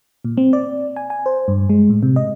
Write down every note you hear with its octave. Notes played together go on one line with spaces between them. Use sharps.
A#2
C4
D5
G#5
G#5
C5
G2
G#3
A2
C3
D#5